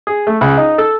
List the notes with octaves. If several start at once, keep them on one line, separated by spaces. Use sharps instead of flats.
G#4
A3
C#2
D#4
A4